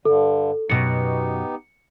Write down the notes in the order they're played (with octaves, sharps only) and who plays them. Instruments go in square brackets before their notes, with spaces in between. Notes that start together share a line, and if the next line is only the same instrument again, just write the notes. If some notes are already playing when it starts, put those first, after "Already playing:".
[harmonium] G2 D3 [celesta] A4
[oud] F#2 B2 [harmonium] B3 D#4 G4 [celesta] C#7